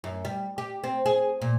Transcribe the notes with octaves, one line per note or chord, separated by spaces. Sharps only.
F#2
G3
G4
C4
G#4
A#2